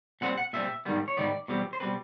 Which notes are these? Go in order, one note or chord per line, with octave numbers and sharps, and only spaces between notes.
A#2 G3 C4 F#5
F#5
A#2 G3 C4 E5
G#2 D#3 G3 B3
C#5
G#2 D#3 G3 B3 D5
E2 B2 G3 C4
C5
B2 G3 C4 B4